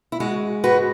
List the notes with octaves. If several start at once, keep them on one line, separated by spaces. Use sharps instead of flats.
E4
G#3 F#4
G#2 F#4 B4